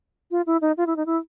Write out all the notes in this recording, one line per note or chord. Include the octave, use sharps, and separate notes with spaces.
F4
E4
D#4
F4
E4
D#4
E4